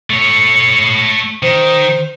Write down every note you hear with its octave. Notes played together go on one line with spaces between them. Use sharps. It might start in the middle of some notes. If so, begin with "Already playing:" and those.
A3 C#5
D#3 C5